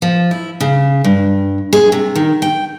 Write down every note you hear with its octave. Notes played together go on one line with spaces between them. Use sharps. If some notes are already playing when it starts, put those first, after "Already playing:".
F3
E4
C#3
G2
G#4
C3
D#3
G5